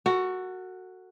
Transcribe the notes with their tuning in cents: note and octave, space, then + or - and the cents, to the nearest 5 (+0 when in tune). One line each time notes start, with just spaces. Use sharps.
F#4 +0 A4 +40